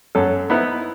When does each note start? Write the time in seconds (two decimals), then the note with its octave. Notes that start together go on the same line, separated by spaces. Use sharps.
0.15 F#2 F#3 A4
0.50 B3 D#4 E4 B4 C5